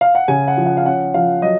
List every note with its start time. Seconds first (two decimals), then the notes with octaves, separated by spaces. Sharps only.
0.01 F5
0.15 F#5
0.28 C#3 G#5
0.48 F#5
0.57 F3
0.66 F#5
0.77 F5
0.85 C#4 F#5
1.14 F3 F5
1.42 F#3 D#5